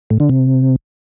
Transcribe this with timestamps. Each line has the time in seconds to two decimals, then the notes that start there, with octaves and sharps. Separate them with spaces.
0.10 A2
0.20 D3
0.29 C3